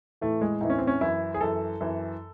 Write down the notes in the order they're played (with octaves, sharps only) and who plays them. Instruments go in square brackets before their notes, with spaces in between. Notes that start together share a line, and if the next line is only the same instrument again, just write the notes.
[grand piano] A2 E3 A3
G#3
A2 E3 D#4
C#4
C4
C#4
F#2 E3 E4
G#4
F#2 E3 A4
F#2 E3